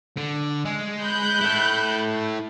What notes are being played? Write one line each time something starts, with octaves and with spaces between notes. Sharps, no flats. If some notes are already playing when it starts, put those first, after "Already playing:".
D3
G#3
B5 F#6 G6
E4 A4